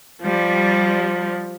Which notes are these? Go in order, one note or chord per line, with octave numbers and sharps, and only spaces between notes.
F3 G3